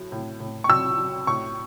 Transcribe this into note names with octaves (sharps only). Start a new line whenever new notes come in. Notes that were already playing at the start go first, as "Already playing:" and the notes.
Already playing: A2 F#3
A2
A2
C#6
F#3 E6
F#3
A2 C#6